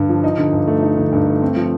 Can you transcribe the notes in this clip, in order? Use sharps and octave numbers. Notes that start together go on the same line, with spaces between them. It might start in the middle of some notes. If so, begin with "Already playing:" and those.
Already playing: G2 D3
F3
D#4
D3
G2
A3
D#4
D3
G2
A3
C4
F3